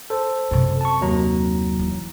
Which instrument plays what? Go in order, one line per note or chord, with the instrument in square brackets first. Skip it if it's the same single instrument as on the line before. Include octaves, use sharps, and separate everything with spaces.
[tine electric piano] A4 C5
[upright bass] F#2 C3
[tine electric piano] A5 C#6
D#2 F#3 A#5
[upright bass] E3